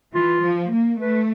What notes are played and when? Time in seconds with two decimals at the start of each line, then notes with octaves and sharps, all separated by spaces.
0.14 E3 F4
0.43 F3
0.73 A#3
1.00 A3 B4